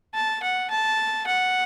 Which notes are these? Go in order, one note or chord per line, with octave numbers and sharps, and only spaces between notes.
A5
F#5
A5
F#5